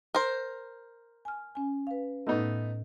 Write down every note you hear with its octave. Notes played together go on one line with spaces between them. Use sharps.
A#4 C5
G#5 F6
C#4 G#5
B4 F5
A2 A3 B3 D#4 D#5